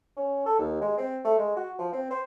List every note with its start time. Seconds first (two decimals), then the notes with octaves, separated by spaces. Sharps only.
0.17 C#4
0.46 A4
0.59 D#2
0.81 G#3
0.97 C4
1.24 A3
1.38 G#3
1.56 F#4
1.78 F3
1.93 C4
2.11 C5